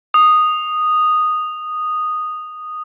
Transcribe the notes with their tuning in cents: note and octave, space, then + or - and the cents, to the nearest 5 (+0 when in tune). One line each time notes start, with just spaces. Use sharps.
D#6 -10